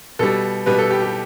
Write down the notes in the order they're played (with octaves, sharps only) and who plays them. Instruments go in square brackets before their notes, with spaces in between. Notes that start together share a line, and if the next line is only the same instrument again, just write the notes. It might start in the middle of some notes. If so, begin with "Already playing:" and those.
[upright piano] B2 G3 A4
B2 G3 B4
A4
G4
G4